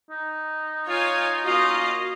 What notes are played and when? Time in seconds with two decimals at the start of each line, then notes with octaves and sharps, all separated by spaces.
0.11 D#4
0.87 F4 C#5 G#5
1.44 A#3 C#4 F4 F#4 D#5 F5